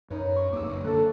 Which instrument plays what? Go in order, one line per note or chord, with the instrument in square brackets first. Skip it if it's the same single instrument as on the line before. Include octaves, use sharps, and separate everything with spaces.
[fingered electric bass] F#2 [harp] D#4 B4 C#5
[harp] C#6
[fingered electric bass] F2 A#3 [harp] D6 E6
[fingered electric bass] F#1
[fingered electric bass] D3 A#3 D4 [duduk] A4 [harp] C#6 F#6